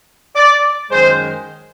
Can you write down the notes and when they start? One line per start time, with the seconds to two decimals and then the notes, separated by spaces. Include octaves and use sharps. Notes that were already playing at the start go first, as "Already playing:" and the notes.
0.36 D5
0.91 F#2 D#3 G#3 C5